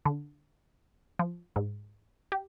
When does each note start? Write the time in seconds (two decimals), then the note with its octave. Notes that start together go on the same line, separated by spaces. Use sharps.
0.05 D3
1.19 F3
1.56 G#2
2.32 G4